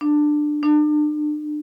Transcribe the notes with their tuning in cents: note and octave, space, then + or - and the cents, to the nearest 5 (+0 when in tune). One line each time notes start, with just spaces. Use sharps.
D4 +20
D4 +40